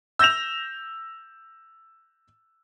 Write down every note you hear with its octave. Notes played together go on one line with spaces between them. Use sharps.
E6 G6 A#6 E7 F7